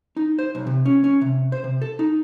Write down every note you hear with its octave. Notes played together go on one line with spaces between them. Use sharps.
D#4
C5
B1
C3
C#4
C#4
C3
C5
C3
A4
D#4